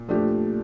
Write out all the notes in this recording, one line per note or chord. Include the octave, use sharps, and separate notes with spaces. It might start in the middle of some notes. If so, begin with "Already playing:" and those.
Already playing: A#2
F3 A3 D4 G4